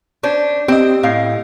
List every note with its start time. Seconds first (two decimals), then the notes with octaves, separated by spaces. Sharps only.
0.23 C#4 D4 C5
0.68 C4 G4 D#5
1.03 A2 F5